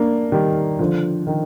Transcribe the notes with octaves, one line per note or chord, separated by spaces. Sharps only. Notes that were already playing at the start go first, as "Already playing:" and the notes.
Already playing: A#3 D4
D#3 G3
D3 F3
D#3